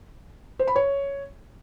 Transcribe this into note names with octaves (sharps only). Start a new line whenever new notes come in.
C5
B5
C#5